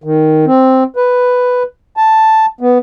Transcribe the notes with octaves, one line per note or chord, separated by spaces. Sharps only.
D#3
C4
B4
A5
B3